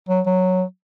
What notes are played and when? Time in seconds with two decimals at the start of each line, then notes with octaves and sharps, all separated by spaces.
0.09 F#3
0.26 F#3